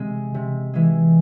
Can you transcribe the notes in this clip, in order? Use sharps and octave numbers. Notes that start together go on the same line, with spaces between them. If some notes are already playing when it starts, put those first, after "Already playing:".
Already playing: C3 G#3
C3
E3 G#3